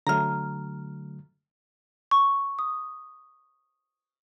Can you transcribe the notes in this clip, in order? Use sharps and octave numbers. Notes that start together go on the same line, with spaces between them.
D3 F#3 A3 A#5 F6
C#6
D#6